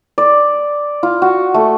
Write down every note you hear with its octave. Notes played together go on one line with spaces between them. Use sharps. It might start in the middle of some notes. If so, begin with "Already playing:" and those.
D5
F4
F#4
A3